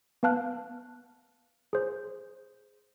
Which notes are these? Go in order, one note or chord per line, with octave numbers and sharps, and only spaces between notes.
B3 B4 F5 A5 F6 F#6
G#4 C5